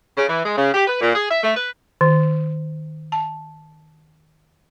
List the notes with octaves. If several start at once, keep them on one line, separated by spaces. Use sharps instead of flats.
C#3
E3
G#3
C#3
G4
B4
A#2
G#4
E5
A3
B4
D#3
A5